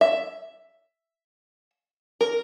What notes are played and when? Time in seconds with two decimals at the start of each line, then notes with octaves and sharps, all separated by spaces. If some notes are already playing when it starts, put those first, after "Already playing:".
0.01 E5
2.21 A#4